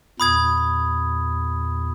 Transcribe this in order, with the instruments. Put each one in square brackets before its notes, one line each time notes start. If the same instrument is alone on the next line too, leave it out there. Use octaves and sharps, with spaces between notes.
[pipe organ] E2 A#2 [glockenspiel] B5 D#6 G#6